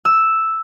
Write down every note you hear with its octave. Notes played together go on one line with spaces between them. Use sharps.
E6